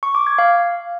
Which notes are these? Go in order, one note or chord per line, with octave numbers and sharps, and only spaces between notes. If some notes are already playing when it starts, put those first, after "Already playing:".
C#6
D6
G#6
F5